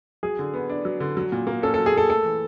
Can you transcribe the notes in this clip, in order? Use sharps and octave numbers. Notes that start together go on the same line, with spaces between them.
F#3 G#4
D3
B3
D4
F#3
D3
F#3
A#2
A#3
C#4 A4
F#3 A4
G#4
A#2 A4
A3 A4
E3